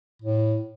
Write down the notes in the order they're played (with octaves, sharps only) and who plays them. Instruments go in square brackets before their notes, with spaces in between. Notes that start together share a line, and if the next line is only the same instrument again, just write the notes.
[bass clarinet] A2